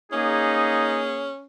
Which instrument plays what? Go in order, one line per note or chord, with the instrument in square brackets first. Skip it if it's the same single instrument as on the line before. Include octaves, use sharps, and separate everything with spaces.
[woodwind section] A#3 G#4 [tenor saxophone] C#4 [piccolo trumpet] D#4